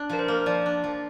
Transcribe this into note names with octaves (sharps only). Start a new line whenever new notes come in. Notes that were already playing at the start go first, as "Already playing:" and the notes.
Already playing: D4
F3 A#4
C5
A#3
F3 D5
D4
F3